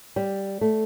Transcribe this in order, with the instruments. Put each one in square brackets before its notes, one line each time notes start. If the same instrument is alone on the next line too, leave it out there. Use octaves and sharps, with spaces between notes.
[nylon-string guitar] G3
A3